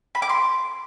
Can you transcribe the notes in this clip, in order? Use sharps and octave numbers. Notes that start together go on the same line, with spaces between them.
B5
D6
C6